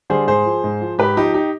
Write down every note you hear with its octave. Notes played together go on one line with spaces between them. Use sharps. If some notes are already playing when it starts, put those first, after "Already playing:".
D3 G3 G#4 C5
G#2 G#4 C5
F3
G#2
F3
G#2 G4 B4
F3 D#4 G4
D#4 G4